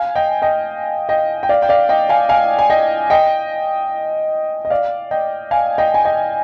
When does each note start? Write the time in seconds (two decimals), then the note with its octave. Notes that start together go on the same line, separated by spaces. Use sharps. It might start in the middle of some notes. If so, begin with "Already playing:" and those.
Already playing: F5 G#5
0.16 D#5 G5
0.42 D#5 G5
1.09 D#5 G5
1.43 G5
1.49 D5 F5
1.62 G5
1.69 D5 F5
1.89 D#5 G5
2.09 F5 G#5
2.29 F5 G#5
2.59 G#5
2.70 D#5 G5
3.10 D#5 G5
4.65 D#5
4.70 D5 F5
5.11 D#5 G5
5.51 F5 G#5
5.78 D#5 G5
5.94 G#5
6.05 D#5 G5